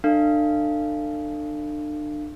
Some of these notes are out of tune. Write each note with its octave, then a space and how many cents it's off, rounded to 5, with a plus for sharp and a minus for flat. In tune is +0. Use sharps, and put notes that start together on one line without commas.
D4 +35 A4 +30 F5 -20